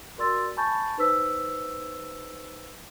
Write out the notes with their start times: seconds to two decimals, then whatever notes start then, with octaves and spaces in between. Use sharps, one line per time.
0.18 F#4 A#4 D5 C6 E6 A6
0.57 G#5 A5 B5 C#6 G6 A6
0.97 D#4 B4 C5 E6 B6